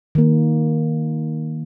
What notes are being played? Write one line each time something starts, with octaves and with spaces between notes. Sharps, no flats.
D#3 A#3